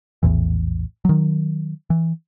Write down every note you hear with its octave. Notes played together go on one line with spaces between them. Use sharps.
A#1 E2 A2 E3
D#3 F#3
E3